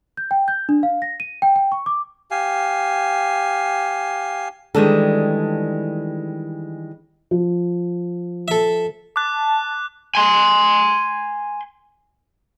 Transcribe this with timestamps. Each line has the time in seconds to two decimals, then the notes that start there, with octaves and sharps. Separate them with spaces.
0.17 G6
0.31 G5
0.48 G6
0.69 D4
0.83 F5
1.02 A#6
1.20 D#7
1.42 G5
1.56 G5
1.72 C#6
1.86 D6
2.31 G4 F5 G#5
4.75 D#3 E3 G3 G#3 D4 A4
7.31 F3
8.48 A4 E5
9.16 A5 D6 F#6
10.15 G#5 C6